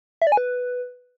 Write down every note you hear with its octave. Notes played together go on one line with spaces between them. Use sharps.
E5
D5
G#5
B4